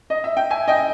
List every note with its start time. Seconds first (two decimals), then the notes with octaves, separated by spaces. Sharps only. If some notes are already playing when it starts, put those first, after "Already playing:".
0.10 D#5
0.24 E5
0.37 G5
0.50 E5 G#5
0.68 D#5 G5